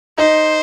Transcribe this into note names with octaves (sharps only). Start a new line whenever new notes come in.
D#4 C5